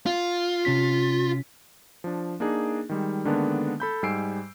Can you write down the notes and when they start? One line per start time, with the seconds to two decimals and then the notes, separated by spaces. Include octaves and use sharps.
0.06 F4
0.65 C3 C#4 B6
2.04 F3 D4
2.40 A#3 D4 D#4 G#4
2.89 D#3 G3 G#3
3.25 D3 D#3 G#3 A#3 B3 D4
3.80 A4 B5 G6
4.03 G#2 G3 G#5 E6 C7 D7